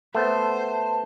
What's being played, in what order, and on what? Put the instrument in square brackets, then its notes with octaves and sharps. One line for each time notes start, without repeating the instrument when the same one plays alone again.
[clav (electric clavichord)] A3 B3 [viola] C5 [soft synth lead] A5